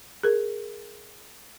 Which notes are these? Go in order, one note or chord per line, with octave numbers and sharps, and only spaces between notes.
G#4 A#4